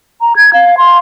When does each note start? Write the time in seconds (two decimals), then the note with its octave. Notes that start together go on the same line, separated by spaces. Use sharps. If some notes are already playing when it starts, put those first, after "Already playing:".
0.21 A#5
0.36 G#6
0.53 F5
0.78 C6